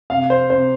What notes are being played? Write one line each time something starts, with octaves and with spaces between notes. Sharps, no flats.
C3 F5
C5
C3 C5